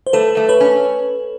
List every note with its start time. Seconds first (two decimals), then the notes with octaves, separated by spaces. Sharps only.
0.07 C5
0.13 A3 A4 B4
0.37 A3
0.49 B4 C#5
0.60 C#4